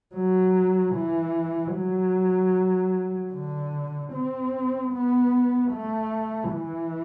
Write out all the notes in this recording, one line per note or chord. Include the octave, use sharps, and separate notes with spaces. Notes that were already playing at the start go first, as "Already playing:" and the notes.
F#3
E3
F#3
D3
C4
B3
A3
E3